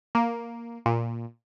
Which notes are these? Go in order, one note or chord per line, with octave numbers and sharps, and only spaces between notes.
A#3
A#2